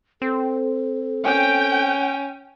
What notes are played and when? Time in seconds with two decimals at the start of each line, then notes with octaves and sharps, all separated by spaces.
0.22 C4 A4
1.25 C#4 G5